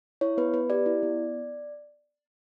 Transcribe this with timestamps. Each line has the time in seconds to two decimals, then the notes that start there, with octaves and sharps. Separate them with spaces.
0.21 E4 C#5
0.37 B3 B4
0.54 B3 B4
0.70 G4 D5
0.86 E4
1.03 B3